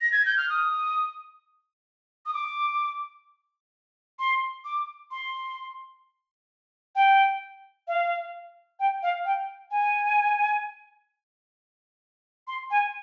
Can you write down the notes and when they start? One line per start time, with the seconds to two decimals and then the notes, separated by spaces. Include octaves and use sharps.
0.01 A#6
0.12 G#6
0.25 G6
0.37 F6
0.49 D#6
2.26 D#6
2.34 D6
4.19 C6
4.65 D6
5.11 C6
6.95 G5
7.88 F5
8.80 G5
9.03 F5
9.25 G5
9.71 G#5
12.47 C6
12.71 G#5